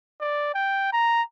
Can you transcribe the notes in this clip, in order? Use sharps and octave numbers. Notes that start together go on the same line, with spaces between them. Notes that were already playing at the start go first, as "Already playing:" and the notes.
D5
G5
A#5